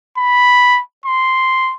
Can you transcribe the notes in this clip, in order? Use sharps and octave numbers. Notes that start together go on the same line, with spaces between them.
B5
C6